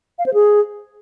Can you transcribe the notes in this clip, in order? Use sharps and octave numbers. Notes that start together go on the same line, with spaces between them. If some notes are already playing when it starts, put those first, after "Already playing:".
F5
C5
G#4